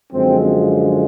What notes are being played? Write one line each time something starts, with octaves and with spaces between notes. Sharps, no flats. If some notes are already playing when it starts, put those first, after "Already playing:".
F#2 D3 F3 G#3 C4